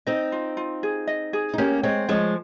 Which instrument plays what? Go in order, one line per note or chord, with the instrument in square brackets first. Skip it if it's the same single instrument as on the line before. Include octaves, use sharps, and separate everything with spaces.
[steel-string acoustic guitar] C4 D#4 [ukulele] D#5
[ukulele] F4
F4
G#4
D#5
G#4
[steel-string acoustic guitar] D#4
[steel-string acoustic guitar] A#3 C#4 [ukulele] G4
[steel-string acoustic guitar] G#3 C4 [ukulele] C#5
[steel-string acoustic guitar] F3 G#3 [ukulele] C#5